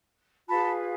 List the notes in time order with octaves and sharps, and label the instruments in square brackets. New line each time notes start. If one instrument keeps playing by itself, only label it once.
[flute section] F4 G#4 B4 A5 B5